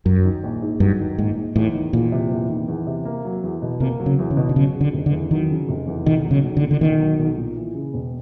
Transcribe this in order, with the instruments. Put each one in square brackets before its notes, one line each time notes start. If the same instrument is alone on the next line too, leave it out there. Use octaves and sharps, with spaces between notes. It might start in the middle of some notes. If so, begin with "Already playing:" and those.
[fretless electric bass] F#2 [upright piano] F#3
[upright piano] D#3
A#1
G#2
[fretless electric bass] G2 [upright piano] F#3
[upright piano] D#3
[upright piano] A#1 [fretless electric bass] G#2
[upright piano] G#2
[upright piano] E2 [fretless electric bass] A2
[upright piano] D#3
[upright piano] E2 [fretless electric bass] A#2
[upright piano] C3
E2
D#3
E2
C3
A#3
F#3
E2
B2
[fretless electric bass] C3 [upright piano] A#3
[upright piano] F#3
[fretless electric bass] C#3
[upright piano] E2
[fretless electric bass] C#3
[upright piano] B2
[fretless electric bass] D3
[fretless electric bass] C#3 [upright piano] F#3
[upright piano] C#3
[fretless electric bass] D3
[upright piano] F1
[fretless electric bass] D3
[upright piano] E2
[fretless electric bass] D#3 [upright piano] F#3
[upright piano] C#3
F1
E2
[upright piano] B1 [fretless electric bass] D#3
[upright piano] F#3
[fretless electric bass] C#3
[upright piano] B1
[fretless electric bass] D3
[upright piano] A#2
[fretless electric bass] D3
[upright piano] B1 [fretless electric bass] D#3
[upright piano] F#3
B1
A#2
E3
C#3
E1